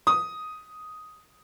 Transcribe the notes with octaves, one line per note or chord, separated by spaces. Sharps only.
D#6